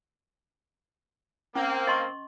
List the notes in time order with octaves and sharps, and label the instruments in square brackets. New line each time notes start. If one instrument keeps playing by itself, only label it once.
[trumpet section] A#3 C4 [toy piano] C#4
[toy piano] D#5 C6 C#6